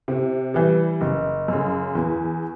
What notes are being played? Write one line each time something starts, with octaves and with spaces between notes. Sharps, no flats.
C3
E3 G3
F#1
F#2 C#3
E2